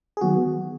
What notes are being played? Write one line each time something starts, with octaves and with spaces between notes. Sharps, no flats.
G#4
D#3 F#3 B3 F#4